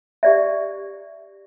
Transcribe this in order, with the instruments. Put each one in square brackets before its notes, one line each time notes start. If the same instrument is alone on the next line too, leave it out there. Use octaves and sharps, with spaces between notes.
[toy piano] G4 D5 E5